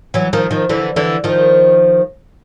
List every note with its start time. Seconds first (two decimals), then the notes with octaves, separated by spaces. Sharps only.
0.14 E3 F#3
0.33 D#3 F3
0.51 D#3 F3
0.69 D3 E3
0.96 D3 E3
1.24 D#3 F3